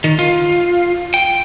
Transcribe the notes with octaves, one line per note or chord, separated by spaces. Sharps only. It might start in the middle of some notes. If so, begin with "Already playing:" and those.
D#3
F4
G5